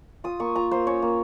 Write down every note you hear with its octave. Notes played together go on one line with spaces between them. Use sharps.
F4 D#6
A#3 C#6
F4 A#5
A#3 C5
C#4 C#5
A#3